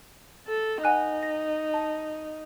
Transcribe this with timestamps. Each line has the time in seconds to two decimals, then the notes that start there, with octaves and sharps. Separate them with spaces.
0.47 A4
0.84 D#4 F#5 G#5 F#6
1.23 A#6
1.74 A5